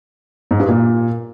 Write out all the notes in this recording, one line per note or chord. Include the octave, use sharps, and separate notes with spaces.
G#2
G2
A#2